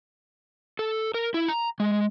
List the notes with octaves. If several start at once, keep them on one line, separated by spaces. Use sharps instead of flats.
A4
A#4
E4
A#5
G#3